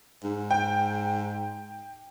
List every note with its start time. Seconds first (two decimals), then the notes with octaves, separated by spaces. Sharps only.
0.24 G#2
0.51 G5